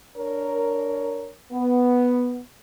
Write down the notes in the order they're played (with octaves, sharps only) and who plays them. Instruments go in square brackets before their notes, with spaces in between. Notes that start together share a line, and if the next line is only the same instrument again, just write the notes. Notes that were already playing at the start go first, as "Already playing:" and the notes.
[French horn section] D4 A#4 C#5
B3